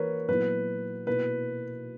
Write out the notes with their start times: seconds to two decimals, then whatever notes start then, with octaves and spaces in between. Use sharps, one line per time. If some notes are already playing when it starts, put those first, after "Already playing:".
Already playing: E3 A#3 F#4 A#4 B4 C#5
0.28 A#2 F#3 B3 E4 B4
1.07 B2 A#3 E4 B4